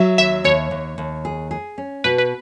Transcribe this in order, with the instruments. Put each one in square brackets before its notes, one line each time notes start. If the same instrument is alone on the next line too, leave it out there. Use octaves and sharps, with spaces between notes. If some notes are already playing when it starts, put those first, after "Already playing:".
Already playing: [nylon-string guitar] F#3 [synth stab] E5
[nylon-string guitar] D#2 [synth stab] E5
[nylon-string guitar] D#2 [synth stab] C#5
[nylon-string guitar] D#2
D#2
G#4
G#4
C#4
[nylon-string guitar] B2 [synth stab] B4
[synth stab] B4